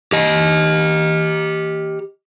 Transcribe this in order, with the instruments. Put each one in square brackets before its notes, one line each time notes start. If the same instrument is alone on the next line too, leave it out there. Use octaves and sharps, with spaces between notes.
[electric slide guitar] G4 D#5